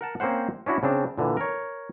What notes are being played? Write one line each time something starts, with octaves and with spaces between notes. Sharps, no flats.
A#4 F#5 A5
A#3 C4 C#4 C5 F#5
C#4 D4 E4 F#4
C#3 C4 D4
A#2 D3 E3
A#4 C#5